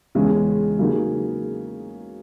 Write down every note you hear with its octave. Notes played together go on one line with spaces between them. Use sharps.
E2 C#3 G#3 C#4 G#4
C#3 F#3 A#3 D#4 G#4